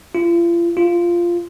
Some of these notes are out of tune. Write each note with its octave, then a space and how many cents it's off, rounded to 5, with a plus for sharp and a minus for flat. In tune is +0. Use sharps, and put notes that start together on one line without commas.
F4 -40
F4 -10